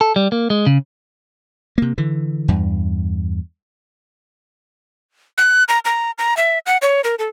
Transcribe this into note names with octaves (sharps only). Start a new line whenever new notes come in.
A4
G3
A#3
G#3
C#3
C3 A#3
D3 E3
E2 G2
F#6
A#5
A#5
A#5
E5
F#5
C#5
A#4
A4